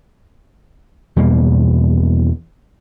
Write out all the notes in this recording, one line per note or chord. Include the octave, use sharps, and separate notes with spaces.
E2 B2 G3 A#3